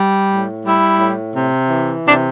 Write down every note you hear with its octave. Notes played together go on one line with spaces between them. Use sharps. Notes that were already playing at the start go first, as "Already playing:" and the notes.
Already playing: G3
A2
G3 E4
A2
C3
E3
C3 D4